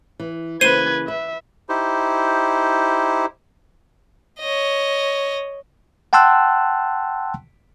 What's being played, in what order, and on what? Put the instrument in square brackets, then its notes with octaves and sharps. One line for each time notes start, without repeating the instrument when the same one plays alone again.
[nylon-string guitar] E3
[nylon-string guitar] C#3 E3 A#3 [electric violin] B4 G#6 [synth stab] C5 [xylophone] D#7 G7
[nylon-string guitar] B4 [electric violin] E5
[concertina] D#4 E4 G4 C5
[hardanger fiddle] C#5 D#5
[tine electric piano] F#5 G5 A5 C6 E6 F#6